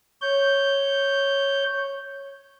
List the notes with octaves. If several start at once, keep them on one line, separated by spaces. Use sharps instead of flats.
C#5 G6